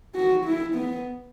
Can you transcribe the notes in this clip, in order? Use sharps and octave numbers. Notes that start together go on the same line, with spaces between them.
F#4
E4
B3